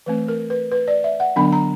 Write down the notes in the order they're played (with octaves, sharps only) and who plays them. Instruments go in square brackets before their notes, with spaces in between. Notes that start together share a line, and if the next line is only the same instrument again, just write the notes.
[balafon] E3 A3 C4 B4
A#4
B4
B4
D5
E5
F#5
D3 F#3 B3 D4 B5
A#5